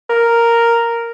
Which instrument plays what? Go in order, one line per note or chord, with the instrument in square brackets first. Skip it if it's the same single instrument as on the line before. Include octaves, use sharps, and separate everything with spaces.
[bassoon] A#4